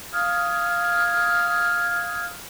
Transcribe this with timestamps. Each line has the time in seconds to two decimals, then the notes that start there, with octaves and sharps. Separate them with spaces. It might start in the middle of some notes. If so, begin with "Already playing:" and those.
0.13 F5 D#6 F6 G#6